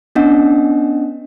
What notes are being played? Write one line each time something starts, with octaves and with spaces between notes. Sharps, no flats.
B3 C#4 D4 D#5 F#5